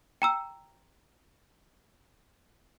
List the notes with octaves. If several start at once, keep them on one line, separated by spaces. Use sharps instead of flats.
G5 A#5 E6